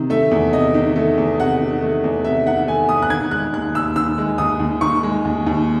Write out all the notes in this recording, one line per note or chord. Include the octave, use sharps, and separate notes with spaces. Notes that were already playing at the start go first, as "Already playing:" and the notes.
Already playing: C3 D#3
A3 E5
E2
C3 D#5
D#3
A3
E2
C3 F#5
D#3
A3
E2
C3 E5
D#3 F#5
A3 G#5
E2 D#6
F#6
D#3 G#6
G#3 F#6
D#2 F#6
D#2 E6
D#3 E6
G#3
D#2 D#6
D#2
D#3 C#6
G#3
D#2
D#2